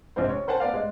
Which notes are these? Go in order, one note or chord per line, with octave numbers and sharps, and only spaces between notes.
A#1 C3 G#3 C4 C5
C#5
A#4 C5 F#5 G#5 A5
B3 B4 D5 F5
G#3